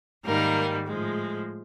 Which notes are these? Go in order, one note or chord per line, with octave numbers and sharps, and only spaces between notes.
G#2 D#3 G3 A#3 A#4
A2 F3 G#3